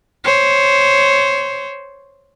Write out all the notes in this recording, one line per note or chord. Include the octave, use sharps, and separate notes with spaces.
C5 C#5